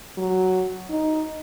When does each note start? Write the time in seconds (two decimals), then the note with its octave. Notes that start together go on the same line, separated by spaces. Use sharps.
0.18 F#3
0.90 D#4